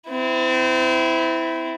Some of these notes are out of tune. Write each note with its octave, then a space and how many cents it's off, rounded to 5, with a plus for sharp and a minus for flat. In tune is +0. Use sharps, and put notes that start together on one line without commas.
C4 -30 E4 +0